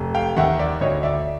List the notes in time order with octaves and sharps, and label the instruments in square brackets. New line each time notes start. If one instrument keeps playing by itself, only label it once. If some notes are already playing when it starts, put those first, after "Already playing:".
Already playing: [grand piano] F1
F5 G5
D#2 D#3 E5 F#5
D5 E5
D2 C#5 D#5
D5 E5